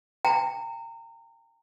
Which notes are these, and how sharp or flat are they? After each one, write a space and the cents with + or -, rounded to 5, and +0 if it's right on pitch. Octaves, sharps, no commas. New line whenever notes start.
G5 +20 A#5 -30